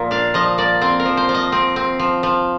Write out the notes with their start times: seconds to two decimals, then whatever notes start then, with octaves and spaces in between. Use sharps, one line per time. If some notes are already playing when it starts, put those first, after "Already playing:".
Already playing: A#2 F3 A#3
0.11 D4 F5
0.34 F3 D#5
0.58 A#3 D5
0.81 C4 C5
1.00 A#4
1.05 F3
1.17 C5
1.29 F3
1.34 D#5
1.52 C4
1.76 C4
1.99 F3
2.23 F3